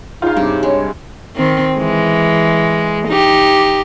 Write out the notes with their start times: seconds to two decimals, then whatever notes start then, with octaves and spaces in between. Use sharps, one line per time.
0.22 C#3 D#4 F4 F5
0.37 G2 C3 D6
0.63 G#3 C#5
1.36 D#3 C4
1.78 E3 G#3
3.08 D#4 G4